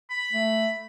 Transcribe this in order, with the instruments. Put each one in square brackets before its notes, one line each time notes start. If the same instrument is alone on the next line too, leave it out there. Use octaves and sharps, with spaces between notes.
[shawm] B5
[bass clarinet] A3